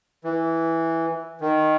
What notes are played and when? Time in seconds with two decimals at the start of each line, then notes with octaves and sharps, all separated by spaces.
0.24 E3
1.41 D#3